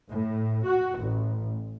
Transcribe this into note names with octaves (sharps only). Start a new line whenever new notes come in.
A2
F#4
A1